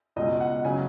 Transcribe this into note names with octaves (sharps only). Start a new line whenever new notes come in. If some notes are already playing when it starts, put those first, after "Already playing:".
C#2 B2 G#3 D#5
F#5
C#3 F#3 G#5